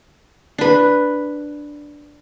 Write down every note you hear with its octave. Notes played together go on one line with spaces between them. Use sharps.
D4 B4